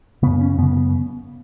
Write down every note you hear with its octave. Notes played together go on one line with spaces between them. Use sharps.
F#2 C#3 B3
C#4
F#2 C#3 B3
B3